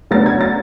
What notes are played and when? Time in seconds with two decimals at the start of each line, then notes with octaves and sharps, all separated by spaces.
0.11 D2 C#3 F#3 B3 D4 A6
0.26 G#6
0.41 A6